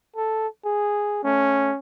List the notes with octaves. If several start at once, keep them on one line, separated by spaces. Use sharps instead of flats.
A4
G#4
A3 C#4